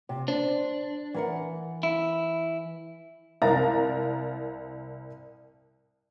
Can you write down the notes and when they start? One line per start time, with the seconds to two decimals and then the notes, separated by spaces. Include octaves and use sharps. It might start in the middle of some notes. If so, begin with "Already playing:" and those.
0.09 C3
0.28 D4 C5
1.14 E3 A#4 F#5
1.83 E4
3.42 C2 A#4 F5 A#5 A6